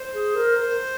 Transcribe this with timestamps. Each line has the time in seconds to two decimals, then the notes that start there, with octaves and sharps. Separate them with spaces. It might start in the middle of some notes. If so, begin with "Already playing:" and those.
Already playing: C5
0.14 G#4
0.36 A#4
0.57 A#4